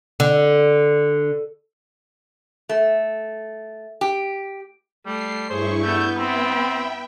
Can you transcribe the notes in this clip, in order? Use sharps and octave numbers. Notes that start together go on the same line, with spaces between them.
D3
A3
G4
G3 A3 C7
G2 E4 G#4 C5 C#5 C#6
A3 B3 G6
C4 E5 G5 B5